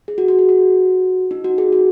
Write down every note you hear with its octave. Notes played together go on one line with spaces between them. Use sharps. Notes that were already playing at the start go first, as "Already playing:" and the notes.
G#4
F#4
F#4
G#4
F#4
D#4
F#4
G#4
F#4